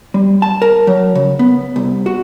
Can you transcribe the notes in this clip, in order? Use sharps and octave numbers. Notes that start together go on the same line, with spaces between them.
G3
A5
A#4
F#3
C#3
B3
C2
F#4